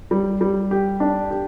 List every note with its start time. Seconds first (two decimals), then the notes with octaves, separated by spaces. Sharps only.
0.11 G3
0.41 G3
0.71 G4
1.00 D4
1.31 G4